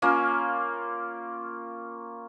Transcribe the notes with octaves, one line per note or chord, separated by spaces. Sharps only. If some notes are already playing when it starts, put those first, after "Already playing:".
A#3 C#4 F4